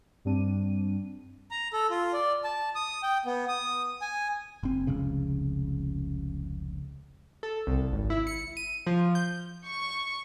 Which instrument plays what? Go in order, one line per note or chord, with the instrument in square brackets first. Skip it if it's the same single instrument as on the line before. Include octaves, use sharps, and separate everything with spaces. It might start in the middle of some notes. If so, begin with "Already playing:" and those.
[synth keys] G2 G3 C4 D4 D#7
[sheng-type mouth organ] A#5
A4
F4
D5
A5
D#6
G5
B3
D#6
G#5
[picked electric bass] F#1 C4
F1 C#2 C#3
[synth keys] A4
C2
G#1
E4
C#7
D#7
F3
G6
[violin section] C#6